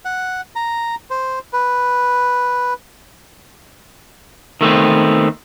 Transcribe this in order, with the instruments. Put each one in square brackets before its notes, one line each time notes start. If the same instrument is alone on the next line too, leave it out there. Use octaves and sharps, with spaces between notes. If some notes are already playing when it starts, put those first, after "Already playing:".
[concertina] F#5
A#5
C5
B4
[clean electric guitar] D#3 A3 B3 C4